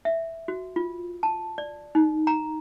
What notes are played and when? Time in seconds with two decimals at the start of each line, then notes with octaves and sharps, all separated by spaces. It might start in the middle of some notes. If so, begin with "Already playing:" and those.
0.05 E5
0.48 F#4
0.76 F4
1.23 A5
1.58 D5
1.95 D#4
2.27 A#5